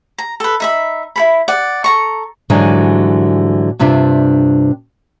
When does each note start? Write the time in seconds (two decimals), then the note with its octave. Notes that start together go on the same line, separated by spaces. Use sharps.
0.18 A#5
0.40 A4 B4
0.60 D#4 E5 B5
1.16 E4 A4 B5
1.48 D5 F#5
1.84 A4 A#5 C#6
2.50 G#2 D3 E3 F#3 G3 G#5
3.79 G2 C3 D4 F4 E5